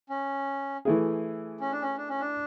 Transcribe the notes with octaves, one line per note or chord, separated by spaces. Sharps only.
C#4
E3 A3 E4 G#4
C#4
D4
C#4
D4
C#4
D4